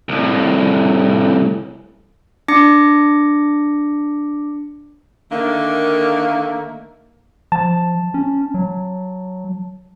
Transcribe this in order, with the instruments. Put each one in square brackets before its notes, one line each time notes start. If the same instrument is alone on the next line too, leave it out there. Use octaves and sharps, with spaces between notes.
[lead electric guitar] C2 A2
[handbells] D4 D6 A#6 C#7
[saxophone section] D3 D#3 A3 A#3
[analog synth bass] F3 [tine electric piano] A5
[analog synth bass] C#4
F#3